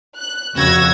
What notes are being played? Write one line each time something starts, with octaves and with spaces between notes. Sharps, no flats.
F#6
F2 C#3 F#4 E6 G#6 A#6